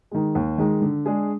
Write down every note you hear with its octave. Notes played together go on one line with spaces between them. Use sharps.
D#3 G#3
D#2
D#3 G#3
D3
G#3 D4 G#4